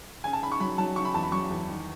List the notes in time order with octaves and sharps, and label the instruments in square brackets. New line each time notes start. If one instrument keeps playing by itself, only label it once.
[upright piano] C#3 G#5
A5
C#3 B5
C#6
F#3 B5
F#3 A5
C#3 C#6
B5
E2 A5
B5
F#3 C#6
E2
D#3